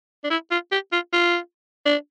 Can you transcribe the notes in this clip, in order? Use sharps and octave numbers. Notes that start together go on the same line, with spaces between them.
D4
E4
F4
G4
F4
F4
D4